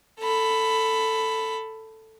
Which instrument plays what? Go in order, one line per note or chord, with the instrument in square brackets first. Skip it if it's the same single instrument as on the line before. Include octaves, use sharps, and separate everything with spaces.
[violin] A4 B5